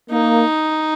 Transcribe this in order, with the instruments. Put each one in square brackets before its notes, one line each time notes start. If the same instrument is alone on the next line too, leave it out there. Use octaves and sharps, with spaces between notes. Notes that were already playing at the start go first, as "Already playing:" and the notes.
[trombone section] A#3 [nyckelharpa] D#4